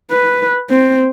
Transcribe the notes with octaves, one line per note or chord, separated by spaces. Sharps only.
B4
C4